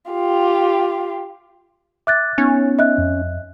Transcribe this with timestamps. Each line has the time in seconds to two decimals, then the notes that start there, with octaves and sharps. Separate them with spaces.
0.12 F4 G4
2.07 E5 D6 F#6 A6
2.38 B3 C#4 D#4
2.79 D#5 E5 F#6
2.98 F2